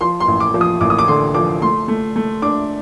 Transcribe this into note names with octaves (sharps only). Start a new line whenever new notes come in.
F3 C6
C6
A1
D6
F3
D#6
A1 D6
D#6
D6
D3 C6
F3 D6
A3 C6
A3
A3
D4 D6